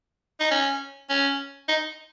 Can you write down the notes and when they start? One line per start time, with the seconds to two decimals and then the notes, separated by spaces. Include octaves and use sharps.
0.40 D#4
0.51 C#4
1.10 C#4
1.68 D#4